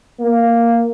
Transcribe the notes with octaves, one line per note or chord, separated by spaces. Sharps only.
A#3